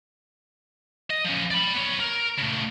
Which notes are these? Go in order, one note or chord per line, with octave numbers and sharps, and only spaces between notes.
D#5
F3 C#4
D5 B5
B3 C#5
A#4
C#3 A3